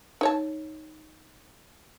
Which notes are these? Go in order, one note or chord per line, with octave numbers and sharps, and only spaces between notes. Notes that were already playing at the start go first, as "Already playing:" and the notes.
D#4 C#5 A5